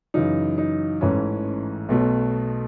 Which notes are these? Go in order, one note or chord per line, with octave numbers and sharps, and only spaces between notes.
F#2 C#3 E3 D#4
D#4
A1 G#2 E3 A3 C#4
B1 B2 A3